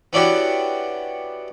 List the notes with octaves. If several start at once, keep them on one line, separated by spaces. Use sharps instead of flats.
B3 C#4 D4 E4 F#4 G4